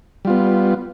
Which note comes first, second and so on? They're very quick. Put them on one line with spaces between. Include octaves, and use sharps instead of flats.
G3 F4 B3